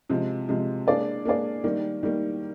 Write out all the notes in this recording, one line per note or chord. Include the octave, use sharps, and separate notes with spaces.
C3 F3 G#3
C3 F3 G#3
A#3 D4 G#4 D5
A#3 D4 G#4 D5
D#3 G3 A#3
D#3 G3 A#3